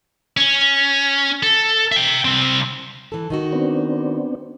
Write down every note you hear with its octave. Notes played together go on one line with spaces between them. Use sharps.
C#4
A4
E5 G5
C2 C4
E3 A4
D#3 D#4 F#4
B3 C4 D4